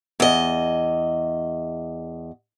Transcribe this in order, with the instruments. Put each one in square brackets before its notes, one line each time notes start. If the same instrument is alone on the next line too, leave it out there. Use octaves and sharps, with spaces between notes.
[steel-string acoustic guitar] E2 D#5